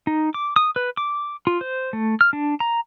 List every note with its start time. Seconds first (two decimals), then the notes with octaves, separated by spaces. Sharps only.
0.07 D#4
0.34 D6
0.56 D#6
0.76 B4
0.97 D6
1.47 F4
1.61 C5
1.93 A3
2.21 F6
2.33 D4
2.60 A#5